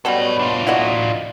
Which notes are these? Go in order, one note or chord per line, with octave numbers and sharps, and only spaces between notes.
B2 F#3 G3 A4 B4
D4 F4
E4 F#4 D#5